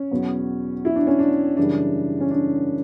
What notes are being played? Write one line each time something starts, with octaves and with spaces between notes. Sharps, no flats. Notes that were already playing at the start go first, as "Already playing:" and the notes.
Already playing: C#4
E2 B2 F#3 B3
E4
D4
C#4
D4
F#2 C#3 E3 G3 D4
C#4
D4